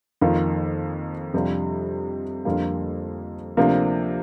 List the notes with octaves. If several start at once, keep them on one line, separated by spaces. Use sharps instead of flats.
F2 D#3 A#3 F4
F2 C3 G3 D4 F4
F2 D3 G3 A#3 F4
D2 C3 F3 A#3 D4